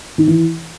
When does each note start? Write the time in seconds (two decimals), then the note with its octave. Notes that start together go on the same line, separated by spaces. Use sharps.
0.18 D#3
0.27 E3